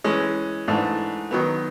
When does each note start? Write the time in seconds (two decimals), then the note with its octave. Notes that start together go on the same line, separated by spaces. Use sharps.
0.04 E3 G#3 C#4
0.68 G#2 E3 A3 D4
1.31 D#3 F#3 B3